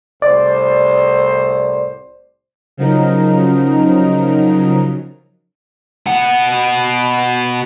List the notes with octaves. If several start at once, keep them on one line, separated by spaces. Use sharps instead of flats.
C2 A2 C5 D5
C#3 F3 F#3 D#4 A#4
B2 F#5